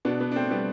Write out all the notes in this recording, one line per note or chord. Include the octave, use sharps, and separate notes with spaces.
B2 B3 D4
B3 D4
D4
A3 C4
G3 B3